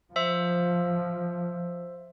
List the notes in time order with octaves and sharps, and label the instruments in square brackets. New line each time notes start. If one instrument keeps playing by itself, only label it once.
[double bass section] F3 [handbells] C5 E5 E6